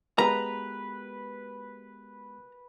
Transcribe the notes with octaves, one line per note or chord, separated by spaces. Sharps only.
G#3 B3 G4 B4 A#5